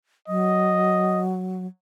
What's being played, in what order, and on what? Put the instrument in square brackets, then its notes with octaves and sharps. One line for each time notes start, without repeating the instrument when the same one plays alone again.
[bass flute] F#3 [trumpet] D#5